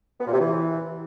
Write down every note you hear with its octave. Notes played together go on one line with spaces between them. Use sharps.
B3
A#2
C3
E3